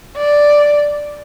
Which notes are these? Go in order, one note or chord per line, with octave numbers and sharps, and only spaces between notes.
D5